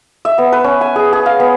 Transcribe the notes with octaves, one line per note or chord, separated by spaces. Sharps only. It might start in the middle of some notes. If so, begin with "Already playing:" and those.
E5
B3
B4
C#4
G#5
G#4
G#4
F5
B3